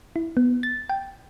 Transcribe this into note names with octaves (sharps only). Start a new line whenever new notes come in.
E4
B3
A6
G5